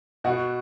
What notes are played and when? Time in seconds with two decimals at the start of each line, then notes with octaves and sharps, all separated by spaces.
0.24 B2 F#4